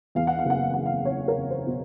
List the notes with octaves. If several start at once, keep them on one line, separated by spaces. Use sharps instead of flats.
E2 F5
F#5
F5
F#1 F#5
F5
F#1 F#5
F5
F#1 C#5
A#4
F#1
C5
B2